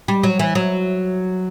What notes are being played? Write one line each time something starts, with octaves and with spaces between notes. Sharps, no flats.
G3
F#3
E3
F#3